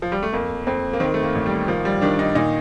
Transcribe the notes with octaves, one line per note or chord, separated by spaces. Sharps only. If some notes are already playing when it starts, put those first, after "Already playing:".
F3
G3
A3
F2 A#3
F2 C4
A#3
D#3 C4
A3
A#3
A1
G3
D#3 F3
G3
D#3 D4
D#4
A#2 D#4